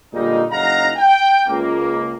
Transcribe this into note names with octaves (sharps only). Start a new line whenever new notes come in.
A#2 D3 G3 G#3 A#3 D#4
F#1 F#3 D#4 F5 F#5 A#5
G5
C#2 A#3